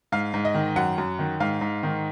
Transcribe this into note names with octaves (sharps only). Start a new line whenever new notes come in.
G#2 F5
G#2
D#5
D#3
F#2 F#5
F#2
D#3
G#2 F5
G#2
D#3